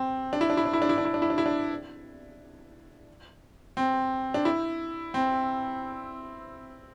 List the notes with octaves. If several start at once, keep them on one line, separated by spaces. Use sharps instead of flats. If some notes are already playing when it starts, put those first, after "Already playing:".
Already playing: C4
D4
E4
D4
E4
D4
E4
D4
E4
D4
E4
D4
E4
D4
E4
D4
C4
D4
E4
C4